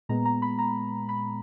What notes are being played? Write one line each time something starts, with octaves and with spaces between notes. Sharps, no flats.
A#2 G#3 B3 A#5
A#5
B5
A#5
B5